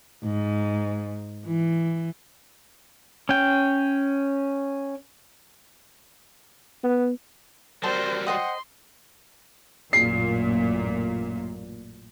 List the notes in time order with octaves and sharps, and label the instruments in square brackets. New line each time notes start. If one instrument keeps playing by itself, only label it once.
[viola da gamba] G#2
E3
[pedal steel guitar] C#4 G5
[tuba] B3
[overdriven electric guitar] F#3 G3 [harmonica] C4 A#4 [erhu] C5 [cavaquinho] A5
[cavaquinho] C5 D#5 D#6 [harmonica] F#5 G5 [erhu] C6
[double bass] A1 F#2 [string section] A#2 [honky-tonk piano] C7